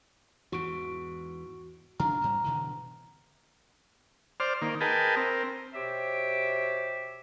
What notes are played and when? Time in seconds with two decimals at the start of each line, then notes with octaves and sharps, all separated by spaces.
0.52 E2 G#2 E3 F#4 C#6 D7
2.00 C#3 D4 A#5 F6
2.21 G#2 G3
2.44 B2 D3 E3
4.40 C5 D5 F6
4.62 D#3 A#3
4.81 G#4 A#4 B4 D#5 G5 A5
5.17 C4 A#4
5.74 B2 G4 C5 C#5 E5 D6